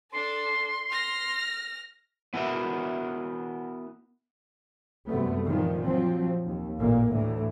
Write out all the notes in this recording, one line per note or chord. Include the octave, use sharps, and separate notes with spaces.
D4 A4 C6
F6 A#6
B3 E4 F#4 A#4 E5
F#2 C3 G3 A3 B3
A#2 D#3 F3
F3 F#3 C4
D#2
A1 A#2 A#3
D2 A2 E3